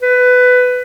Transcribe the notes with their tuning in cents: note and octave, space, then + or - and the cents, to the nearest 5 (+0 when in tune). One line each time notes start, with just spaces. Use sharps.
B4 +15